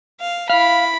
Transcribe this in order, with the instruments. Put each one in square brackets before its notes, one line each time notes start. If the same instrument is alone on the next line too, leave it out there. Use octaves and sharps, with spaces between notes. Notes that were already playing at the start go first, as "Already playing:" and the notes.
[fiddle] F5
[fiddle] E4 B5 [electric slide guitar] F5